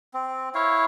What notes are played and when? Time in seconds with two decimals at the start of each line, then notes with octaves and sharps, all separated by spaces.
0.14 C4
0.55 E4 C#5 F5